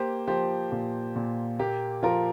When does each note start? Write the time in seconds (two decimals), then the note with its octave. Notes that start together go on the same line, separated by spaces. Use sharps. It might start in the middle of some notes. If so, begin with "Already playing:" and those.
Already playing: A#3 G4 C5
0.27 F3 G4 C5
0.72 A#2 G4
1.16 A#2
1.59 A#3 G4
2.03 F3 F4 A#4